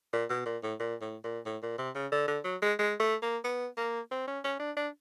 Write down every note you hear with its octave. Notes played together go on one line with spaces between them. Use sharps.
A#2
B2
A#2
A2
A#2
A2
A#2
A2
A#2
C3
C#3
D3
D3
F#3
G#3
G#3
A3
A#3
B3
A#3
C4
C#4
C#4
D4
D4